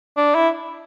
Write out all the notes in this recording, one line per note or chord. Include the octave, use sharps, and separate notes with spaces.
D4
E4